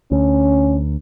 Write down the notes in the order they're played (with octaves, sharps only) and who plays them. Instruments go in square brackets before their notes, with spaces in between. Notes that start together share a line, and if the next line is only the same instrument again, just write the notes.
[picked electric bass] D2 [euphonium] C#4